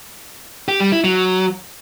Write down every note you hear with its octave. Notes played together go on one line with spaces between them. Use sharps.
G4
G3
E4
F#3